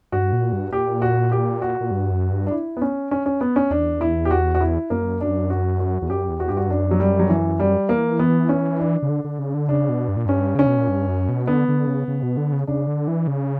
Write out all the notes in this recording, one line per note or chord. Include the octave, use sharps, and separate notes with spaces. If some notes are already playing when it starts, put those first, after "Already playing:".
G2 F#4
A#2
G2
A#2 G4
F#4
G4
F#4
A#2
G2
F#2
G2
D4
E4
B3
C#4
C#4
C#4
B3
C#4
E2 D4
E4
G4
F#4
F#4
E4
F#2 A#3
D4
F#4
F#4
E2
F#2 G4
E2
F#4
G2 G4
F#4
F#2 D4
F#3
G3
F#3
E3
G3
E3 A#3
B3
C#4
D4
C#3
D3
D3
C#3
D3
C#3 D4
B2
G2
A#2
G2 C#4
C#3 C#4
B2
A#2
G2
F#2
B2
D3 B3
D3
C#3
C#3
B2
D3
C#3
C#3 D4
D3
E3
C#3